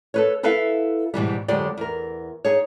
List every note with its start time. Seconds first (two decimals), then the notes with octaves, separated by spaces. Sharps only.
0.14 A4 B4 C#5
0.43 E4 A4 B4 E5 F5
1.14 G#2 B2 E3 G3
1.48 F2 D3 F#3 G#3 G4 D5
1.77 E2 A#4
2.45 D#4 G#4 C#5